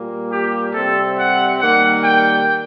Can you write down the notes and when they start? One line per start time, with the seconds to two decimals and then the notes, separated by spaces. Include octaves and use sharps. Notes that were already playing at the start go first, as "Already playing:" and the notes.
Already playing: A#2 G3 A#3
0.29 G4
0.72 C3 G3 C4 A4
1.15 F#5
1.60 D#3 G3 A#3 F#5
2.03 G5